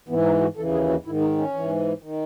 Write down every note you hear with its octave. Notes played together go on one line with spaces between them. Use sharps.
G#2 E3 B3
D#4
F#4
D#2 C#3 E3 A4
G#4
F#4
G#2 D#3 E4
D#4
C#4
G#2 E3
D#3